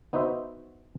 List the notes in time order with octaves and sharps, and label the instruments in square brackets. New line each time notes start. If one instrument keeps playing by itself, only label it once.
[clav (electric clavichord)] B3 D#4 F#4 C5 E5